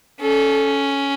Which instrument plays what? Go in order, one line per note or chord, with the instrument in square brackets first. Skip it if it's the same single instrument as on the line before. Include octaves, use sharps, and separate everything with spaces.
[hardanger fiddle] C#4 [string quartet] A4